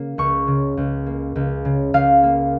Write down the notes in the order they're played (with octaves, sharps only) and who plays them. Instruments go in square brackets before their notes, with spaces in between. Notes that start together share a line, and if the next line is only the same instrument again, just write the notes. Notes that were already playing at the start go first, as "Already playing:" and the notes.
Already playing: [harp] C#3 A#3
C#2 C#6
C#3
C#2
A#3
C#2
C#3
C#2 F5
A#3